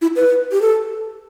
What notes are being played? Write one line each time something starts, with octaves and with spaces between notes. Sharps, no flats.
E4
B4
G4
A4